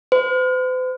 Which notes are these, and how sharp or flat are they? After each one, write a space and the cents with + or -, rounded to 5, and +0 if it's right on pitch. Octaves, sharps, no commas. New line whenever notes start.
C5 -45